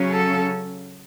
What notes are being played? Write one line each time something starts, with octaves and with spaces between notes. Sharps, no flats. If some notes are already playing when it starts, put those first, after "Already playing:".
Already playing: C#3 F#3 C#4
A4